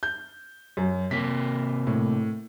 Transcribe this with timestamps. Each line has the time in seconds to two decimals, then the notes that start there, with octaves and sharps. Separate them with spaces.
0.03 G6
0.77 F#2
1.11 C3 A#3 B6
1.87 A2